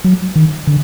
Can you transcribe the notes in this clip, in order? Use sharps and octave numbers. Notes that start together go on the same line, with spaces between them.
F#3
D#3
D3